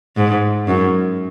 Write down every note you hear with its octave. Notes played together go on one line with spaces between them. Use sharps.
G#2
F#2